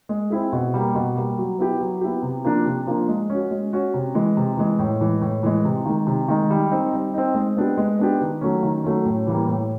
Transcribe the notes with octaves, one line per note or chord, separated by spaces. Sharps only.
G#3
C4 E4 G#4
B2
G3 A#3
B2
G3 A#3
F#3
B3 E4 G4
F#3
B3 E4 G4
C3
F3 A#3 D4
C3
F3 A#3 D4
G#3
C#4 F#4
G#3
C#4 F#4
C3
E3 G#3
C3
E3 G#3
A2
E3 G#3
A2
E3 G#3
C3
D#3 G#3
C3
D#3 G#3
G3
C4 D#4
G3
C4 D#4
G#3
B3 D4 G4
G#3
B3 D4 G4
D#3
F#3 A3 C#4
D#3
F#3 A3 C#4
A2
E3 G3 A#3
A2